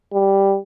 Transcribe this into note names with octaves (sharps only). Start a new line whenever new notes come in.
G3